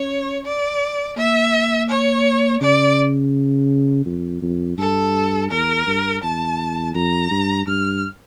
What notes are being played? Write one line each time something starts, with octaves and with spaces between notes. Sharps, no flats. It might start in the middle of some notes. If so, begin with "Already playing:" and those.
Already playing: C#4 C#5
D5
A#3 E5
C#5
C#3 D5
F2
F2
G2 A4
E2 A#4
G2
E2 A5
F2 A#5
G2
G2 F6